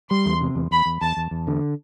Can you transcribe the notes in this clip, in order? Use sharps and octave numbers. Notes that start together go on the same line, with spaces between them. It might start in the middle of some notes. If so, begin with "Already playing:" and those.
G3 C6
E2
C3
E2
E2 B5
E2
E2 A5
E2
E2
D3